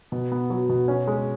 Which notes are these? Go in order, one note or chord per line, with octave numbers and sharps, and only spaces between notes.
B2
B3
F#3
B2
C#4
G#3